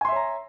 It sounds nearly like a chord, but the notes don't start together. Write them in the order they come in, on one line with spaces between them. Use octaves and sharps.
G#5 C6 E5 C#5 A#5